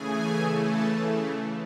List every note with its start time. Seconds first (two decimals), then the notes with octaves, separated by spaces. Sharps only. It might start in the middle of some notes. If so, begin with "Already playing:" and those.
Already playing: C#3 E3 A3 G#4 G#5
0.49 A4 A5